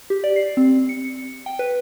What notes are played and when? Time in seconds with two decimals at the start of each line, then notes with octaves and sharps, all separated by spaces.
0.10 G4
0.24 D5
0.36 C7
0.57 C4
0.89 C#7
1.46 G5
1.59 B4